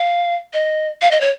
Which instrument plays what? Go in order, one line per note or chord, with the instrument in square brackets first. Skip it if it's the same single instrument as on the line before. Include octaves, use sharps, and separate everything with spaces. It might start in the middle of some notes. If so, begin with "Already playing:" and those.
Already playing: [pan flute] F5
D#5
F5
D#5
C#5